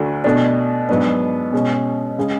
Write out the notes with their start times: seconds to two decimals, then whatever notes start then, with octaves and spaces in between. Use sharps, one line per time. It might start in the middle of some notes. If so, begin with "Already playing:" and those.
Already playing: D2 D3 A3 D4 F#4
0.24 B2 A3 D4
0.89 G#2 F#3 B3 D4
1.52 B2 G#3 C#4
2.18 C#3 G#3